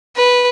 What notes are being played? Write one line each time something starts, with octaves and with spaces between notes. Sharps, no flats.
B4